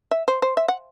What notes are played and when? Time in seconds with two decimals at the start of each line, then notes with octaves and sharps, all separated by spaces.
0.11 E5
0.28 C5
0.42 C5
0.57 E5
0.68 F#5